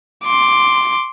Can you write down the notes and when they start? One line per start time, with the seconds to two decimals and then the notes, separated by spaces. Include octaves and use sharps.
0.24 C6 D6